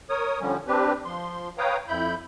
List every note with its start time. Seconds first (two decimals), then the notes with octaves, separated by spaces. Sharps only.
0.09 A#4 C#5 D#6
0.41 D3 F3 G3 C#4
0.67 C4 D4 G4 B4
1.05 F3 C6
1.58 B4 C#5 F5 G5 A#5 D#6
1.88 F2 E4 B5 G6